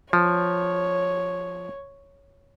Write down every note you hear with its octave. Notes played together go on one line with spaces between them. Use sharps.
F3 C#5